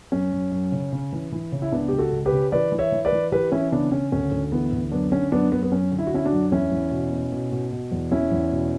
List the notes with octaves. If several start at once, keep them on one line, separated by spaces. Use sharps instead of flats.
F#2 C#4
F#2
F#2
C#3
C#3
E3
E3
C#3
E4
C#2 B3 D4
C#2 G4
F#4 A4
C#2
G4 B4
C#3
E3 B4 D5
E3
C#5 E5
E3
B4 D5
E3
E3 G4 B4
E3 C#4 E4
C#3 B3 D4
C#3 C#4
D2 C#4
D2
E3 B3
D2
F#2 B3 D4
D3 C#4
F#2 B3 D4
F#2 B3
B3
F#2 C#4
D3
E4
F#4
D3 C#4 E4
D4 F#4
F#2
E2 C#4 E4
E2
B2
B2
B2
B2
B2
E2
E2 C#4 E4
E2
B2